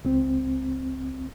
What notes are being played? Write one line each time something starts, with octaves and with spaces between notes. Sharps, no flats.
C#2 C4